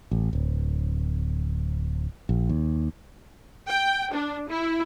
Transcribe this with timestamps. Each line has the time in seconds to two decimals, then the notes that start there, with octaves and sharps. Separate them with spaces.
0.11 A1
0.33 D1
2.29 A#1
2.49 D#2
3.68 G5
4.13 D4
4.48 E4